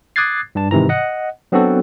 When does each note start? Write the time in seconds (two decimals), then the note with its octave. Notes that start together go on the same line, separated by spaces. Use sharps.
0.16 D6 D#6 F#6 G#6 A6 C7
0.55 G2 D4 A5
0.71 G#2 C3 D#3 E3 A#5
0.89 D#5 F#5
1.52 F#3 B3 C4 D4 F#4 A4